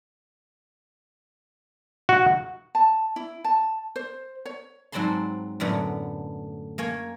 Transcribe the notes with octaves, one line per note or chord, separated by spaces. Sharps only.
F#4
A5
E4
A5
C5
C#5
G#2 F#3 C4 A5 B5 C6
F#2 A2 D3 B3
A#3 C#5 G#5